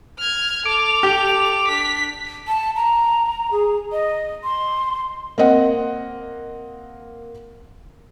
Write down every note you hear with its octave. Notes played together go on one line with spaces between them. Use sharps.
F6 G#6
A4 D6 F7
G4
D4 B6
A5
A#5
G#4
D#5
C6
A#3 C4 D#5 F#5